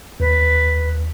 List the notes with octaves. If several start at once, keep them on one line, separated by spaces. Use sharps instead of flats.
D#2 B4